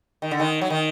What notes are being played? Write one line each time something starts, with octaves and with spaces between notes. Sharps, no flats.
D#3
D3
D#3
F#3
D#3